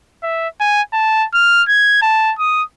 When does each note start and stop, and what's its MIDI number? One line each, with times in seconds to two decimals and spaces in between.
0.23 0.48 76
0.60 0.82 80
0.93 1.25 81
1.34 1.62 89
1.68 2.00 92
2.02 2.33 81
2.39 2.63 87